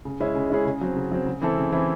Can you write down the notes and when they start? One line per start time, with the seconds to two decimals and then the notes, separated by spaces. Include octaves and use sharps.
0.05 C#3
0.20 G#3 C#4 E4 G#4
0.35 C#3
0.50 G#3 C#4 E4 G#4
0.65 C#3
0.81 F#3 C4
0.96 C#3
1.12 F#3 C4
1.26 C#3
1.41 E3 C4 E4 A4
1.58 C#3
1.72 E3 C4 E4 A4